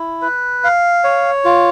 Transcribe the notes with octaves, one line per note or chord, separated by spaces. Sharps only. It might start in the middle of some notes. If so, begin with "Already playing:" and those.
Already playing: E4
B4
F5
C#5
F4